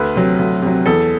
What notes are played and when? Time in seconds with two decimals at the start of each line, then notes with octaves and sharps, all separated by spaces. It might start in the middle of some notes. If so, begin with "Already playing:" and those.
Already playing: D2 B4
0.15 C3 F#3
0.39 D2
0.62 C3 F#3
0.86 E2 A4